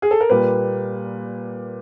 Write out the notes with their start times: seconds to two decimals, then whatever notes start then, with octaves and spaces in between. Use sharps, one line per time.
0.02 G#4
0.11 A4
0.20 A#4
0.30 A#2 G3 A#3 B4